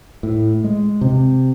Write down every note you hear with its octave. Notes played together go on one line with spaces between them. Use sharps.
A2
G#3
C3